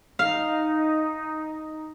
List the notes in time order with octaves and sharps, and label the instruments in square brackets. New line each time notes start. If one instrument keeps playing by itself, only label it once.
[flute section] D#4 [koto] F5